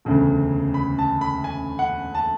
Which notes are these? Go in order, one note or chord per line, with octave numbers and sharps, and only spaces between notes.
E1 D2 C#3
B5
A5
B5
G#5
F#5
A5